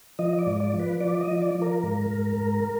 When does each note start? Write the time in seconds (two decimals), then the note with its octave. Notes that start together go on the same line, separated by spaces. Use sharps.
0.19 F3 D#5
0.39 D5
0.46 G#2
0.60 D5
0.73 F3
0.80 B4
1.00 F3 D5
1.21 D#5
1.27 F3
1.42 D5
1.55 F3
1.62 A#4
1.83 G#2
2.10 G#2
2.37 G#2